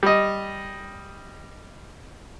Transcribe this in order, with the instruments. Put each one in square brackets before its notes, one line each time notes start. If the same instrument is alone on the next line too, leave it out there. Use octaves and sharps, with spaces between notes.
[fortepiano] G3 D#5